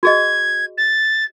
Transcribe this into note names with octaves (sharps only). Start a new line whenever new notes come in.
F#4 G#4 D#5 G#6
A6